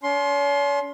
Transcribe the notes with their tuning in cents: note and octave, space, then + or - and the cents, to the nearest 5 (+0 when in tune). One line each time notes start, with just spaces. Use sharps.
C#4 +45 C6 +15